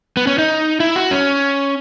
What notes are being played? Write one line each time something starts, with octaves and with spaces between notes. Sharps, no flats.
B3
C#4
D#4
E4
F#4
C#4